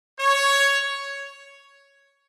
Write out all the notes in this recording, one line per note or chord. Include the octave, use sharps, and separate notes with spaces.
C#5